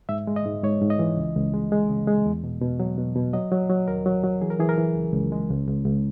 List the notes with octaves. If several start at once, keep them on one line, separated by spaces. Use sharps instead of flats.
G#2 E5
G#3
D#5
G#2
G#2 C#5
G#2
D#5
E3
C#2
C#2
G#3
G#3
C#3
G#3
E2
B2
B2
F#3
B2
B2
F#3 D#5
F#3
F#3
D#2 A#4
F#3
F#3
E3 G#4
A#4
E3 G#4
A#4
E3
C#2
C#2
G#3
C#2
C#2
C#2